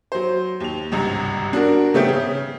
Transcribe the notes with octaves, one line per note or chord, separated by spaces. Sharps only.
F#3 C5
D#2 F7
G#1 C#2 G2 C3 A#5
D4 F#4 A#4
C#3 G3 A3 B3 C4 G4
C#3